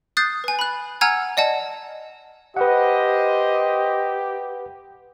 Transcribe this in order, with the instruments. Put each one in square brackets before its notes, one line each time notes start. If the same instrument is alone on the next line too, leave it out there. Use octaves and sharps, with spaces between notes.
[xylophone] D#6 F#6 G6 A6 C7
B4 G#5
B5 F#6
F#5 G#5 A#5 E6 F6 G#6
D5 D#5 F#5 A5
[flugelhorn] G4 [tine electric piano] B4 F#5 [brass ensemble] C5 D#5